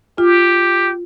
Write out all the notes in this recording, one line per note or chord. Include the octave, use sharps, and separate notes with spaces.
F4 G4